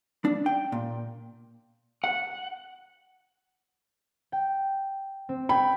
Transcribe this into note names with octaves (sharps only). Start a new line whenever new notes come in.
D4
G5
A#2
F#5
G5
C4
G5 B5 G#6